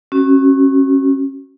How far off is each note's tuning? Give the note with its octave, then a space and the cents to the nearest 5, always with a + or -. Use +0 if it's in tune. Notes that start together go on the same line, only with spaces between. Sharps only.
C#4 -25 F#4 +25